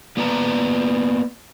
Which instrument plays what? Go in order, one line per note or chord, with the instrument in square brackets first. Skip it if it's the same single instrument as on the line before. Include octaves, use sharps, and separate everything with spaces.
[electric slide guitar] A#3 B3 B4 D5 A5 A#5